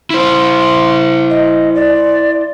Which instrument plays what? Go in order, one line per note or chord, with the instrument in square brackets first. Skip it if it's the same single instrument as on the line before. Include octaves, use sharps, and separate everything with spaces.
[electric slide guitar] E4 C5
[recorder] D#5
D5